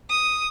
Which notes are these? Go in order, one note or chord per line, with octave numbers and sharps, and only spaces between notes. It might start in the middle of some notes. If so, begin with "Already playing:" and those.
D#6